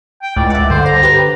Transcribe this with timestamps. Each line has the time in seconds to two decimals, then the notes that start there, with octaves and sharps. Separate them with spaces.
0.22 G5
0.36 C#2 A2 D5
0.50 E5 F#5
0.70 G2 D3 C5
0.86 C5 A#5
1.03 G4 B4